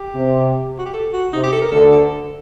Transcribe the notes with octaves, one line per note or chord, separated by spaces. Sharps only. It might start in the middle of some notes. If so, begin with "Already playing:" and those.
Already playing: G4
C3
F#4
G4
A4
F#4
C3 D#4
G4
A4
A#4
D2 D3 A4
A4